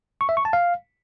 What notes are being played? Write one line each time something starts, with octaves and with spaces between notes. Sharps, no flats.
C#6
E5
C#6
A5
F5